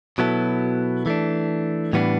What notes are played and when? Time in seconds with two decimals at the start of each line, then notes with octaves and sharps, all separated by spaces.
0.18 B2 F#3 B3 E4 A4
1.06 E3 A3 D4
1.93 A2 E3 G3 B3 D4